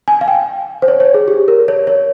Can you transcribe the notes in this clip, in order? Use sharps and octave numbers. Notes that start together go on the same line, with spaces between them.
G#5
F5
G5
C5
C#5
C#5
G#4
G4
A#4
C#5
C#5